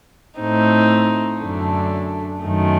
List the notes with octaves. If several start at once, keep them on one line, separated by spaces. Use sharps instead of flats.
A2 A3 C4 D#4
F#2 D3 A3 D4
F#2 D#3 A3